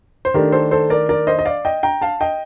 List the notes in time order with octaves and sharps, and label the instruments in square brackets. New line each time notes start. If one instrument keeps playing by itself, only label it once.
[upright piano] C5
D#3 A3 D4 G4 A#4
A4 C5
A4 C5
A#4 D5
A#4 D5
C5 D#5
D#5
D5 F5
D#5 G5
G5 A#5
F5 A5
D#5 G5